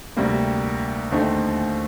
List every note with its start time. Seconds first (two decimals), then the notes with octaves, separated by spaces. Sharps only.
0.17 D2 C3 G3 A#3
1.11 D#2 D3 A3 C4 D#4